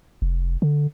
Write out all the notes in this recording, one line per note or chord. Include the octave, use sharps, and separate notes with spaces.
F1
D3